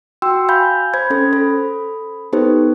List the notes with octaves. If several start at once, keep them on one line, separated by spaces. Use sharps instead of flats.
F#4 G5 C6 E6
F5 G#5 B5 G6
C5 B5 G#6
C#4 A4 C5
A4 B5
B3 D#4 G4 A4 B4 C5